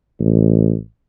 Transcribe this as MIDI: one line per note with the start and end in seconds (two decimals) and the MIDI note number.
0.20 0.76 33